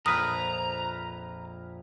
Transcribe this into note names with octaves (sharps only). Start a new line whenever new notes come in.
A#1 F2 A#4 B4 A#5 D#6